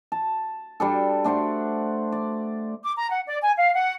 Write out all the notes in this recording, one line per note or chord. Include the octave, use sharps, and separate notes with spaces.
A5
G3 D4 A4
A3 D4 C5 F#5
D5
D6
A#5
F#5
D5
G#5
F5
F#5